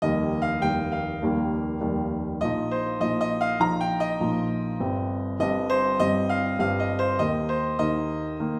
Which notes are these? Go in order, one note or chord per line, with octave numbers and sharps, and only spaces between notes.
F1 D#2 D#3 G3 A#3 D#5
F5
F1 D#2 D#3 G3 A#3 G5
F5
F1 D#2 D#3 G3 A#3
F1 D#2 D#3 G3 A#3
A#1 A#2 F3 D#4 D#5
C5
A#1 A#2 F3 D#4 D#5
D#5
F5
A#1 A#2 F3 D#4 A#5
G5
D#5
A#1 A#2 F3 D#4
G1 G2 G3 C4
G1 G2 G3 C4 D#5
C5
G1 G2 G3 C4 D#5
F5
G1 G2 G3 C4 F5
D#5
C5
D#2 D#3 A#3 D#4 D#5
C5
D#2 D#3 A#3 D#4 D#5
D#3 A#3 D#4